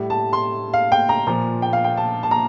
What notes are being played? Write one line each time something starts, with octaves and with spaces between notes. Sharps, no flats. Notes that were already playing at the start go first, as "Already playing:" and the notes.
Already playing: A2 G3
A5
C6
F5
G5
A#5
A#2 F3 A#5
G5
F5
G5
A5
A5
A#5